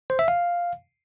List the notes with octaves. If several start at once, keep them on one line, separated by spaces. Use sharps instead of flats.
C5
E5
F5